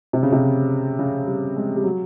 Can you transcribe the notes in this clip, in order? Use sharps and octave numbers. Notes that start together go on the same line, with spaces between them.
C3
C#3
C3
C#3
G3
G#3
G3
F#3